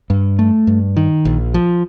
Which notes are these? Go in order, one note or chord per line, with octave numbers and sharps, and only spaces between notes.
G2
A3
G2
D#3
A#1
F3